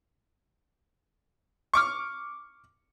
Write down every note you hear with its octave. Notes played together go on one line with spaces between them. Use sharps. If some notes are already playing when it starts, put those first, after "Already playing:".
C#6 D6 F6